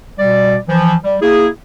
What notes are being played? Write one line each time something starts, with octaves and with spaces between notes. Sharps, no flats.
B2 G3 D5
E3 F3
G3
A#3 E4 G#4